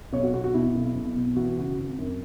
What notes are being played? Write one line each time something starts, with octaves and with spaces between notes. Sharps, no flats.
B1 C#5
F#4
B2 F#4
F#4
B2 E4
B1
B1
B2
E3 F#4
C#3 F#4
G#1
F#2